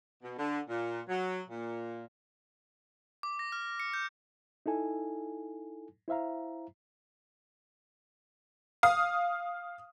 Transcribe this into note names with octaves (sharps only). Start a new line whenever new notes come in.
B2
D3
A#2
F#3
A#2
D6
A#6
F6
C#7
G6
D#4 E4 A4 G#5
E4 C5 E5 F5 A#5
F5 D#6